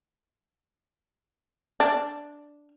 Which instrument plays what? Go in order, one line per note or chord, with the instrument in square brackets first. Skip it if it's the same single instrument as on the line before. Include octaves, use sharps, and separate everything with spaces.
[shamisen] D4